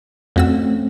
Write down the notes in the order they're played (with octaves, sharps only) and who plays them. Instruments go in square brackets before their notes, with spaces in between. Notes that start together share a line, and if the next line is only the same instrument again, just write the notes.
[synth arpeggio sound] F2 F#4 E6 [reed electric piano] A3 C4 C#4